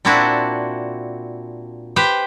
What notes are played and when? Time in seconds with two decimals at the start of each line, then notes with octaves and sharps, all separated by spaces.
0.05 A#2 C4 D4 E4 F#4 A5
1.96 G4 B4 C5 G5